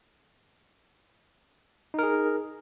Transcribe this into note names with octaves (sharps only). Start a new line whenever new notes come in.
D#4 G#4 A#4